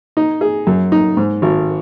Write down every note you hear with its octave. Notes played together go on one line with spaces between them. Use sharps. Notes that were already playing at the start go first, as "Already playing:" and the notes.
D#4
G#4
F#2
D#4
G#2
G#1